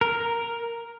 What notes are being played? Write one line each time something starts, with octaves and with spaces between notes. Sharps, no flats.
A#4